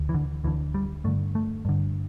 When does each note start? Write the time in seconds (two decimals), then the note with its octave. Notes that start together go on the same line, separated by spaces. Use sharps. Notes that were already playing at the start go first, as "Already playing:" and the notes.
Already playing: D2
0.09 E3
0.14 D3
0.44 D2 D3 E3
0.74 G3
1.04 G2 D3 A3
1.35 A3
1.65 G2 D3